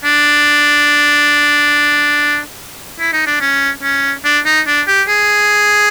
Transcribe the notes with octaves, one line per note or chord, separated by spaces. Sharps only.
D4
E4
D#4
D4
C#4
C#4
D4
D#4
D4
G4
G#4